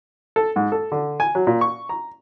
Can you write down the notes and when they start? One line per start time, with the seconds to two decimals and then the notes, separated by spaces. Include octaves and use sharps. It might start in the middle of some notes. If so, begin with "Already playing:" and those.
0.36 A4
0.56 G#2
0.72 A4
0.92 D3
1.20 G#5
1.35 F#3
1.47 A#2
1.61 C#6
1.89 A#5